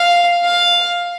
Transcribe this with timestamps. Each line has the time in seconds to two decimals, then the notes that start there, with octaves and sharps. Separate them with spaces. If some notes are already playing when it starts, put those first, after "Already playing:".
Already playing: F5
0.44 F5